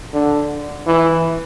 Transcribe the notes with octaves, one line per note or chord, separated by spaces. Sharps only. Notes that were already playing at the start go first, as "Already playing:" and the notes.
D3
E3